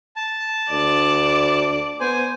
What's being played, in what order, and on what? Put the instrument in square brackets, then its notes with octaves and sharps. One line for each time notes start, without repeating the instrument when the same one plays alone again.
[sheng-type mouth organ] A5
[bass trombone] D2 [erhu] D5
[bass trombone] B3 [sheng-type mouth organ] C5 G#5